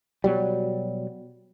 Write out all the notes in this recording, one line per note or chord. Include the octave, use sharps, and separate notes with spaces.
B2 F#3 G3